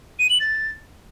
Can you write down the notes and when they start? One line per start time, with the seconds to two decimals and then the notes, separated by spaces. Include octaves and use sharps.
0.19 D#7
0.30 F#7
0.40 A6